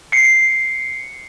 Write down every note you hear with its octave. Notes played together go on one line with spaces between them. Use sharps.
C7 C#7